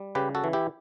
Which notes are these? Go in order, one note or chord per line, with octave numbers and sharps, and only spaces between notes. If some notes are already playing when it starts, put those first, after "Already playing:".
Already playing: G3
C#3 G4 B4
F#4 A4
E3
E4 G4